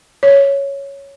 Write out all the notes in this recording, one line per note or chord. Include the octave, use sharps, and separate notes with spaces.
C#5